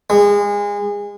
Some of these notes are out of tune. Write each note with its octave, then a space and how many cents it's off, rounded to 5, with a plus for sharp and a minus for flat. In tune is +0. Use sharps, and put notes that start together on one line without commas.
G#3 -30